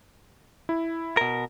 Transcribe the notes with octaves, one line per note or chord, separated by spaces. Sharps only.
E4
B2 A#4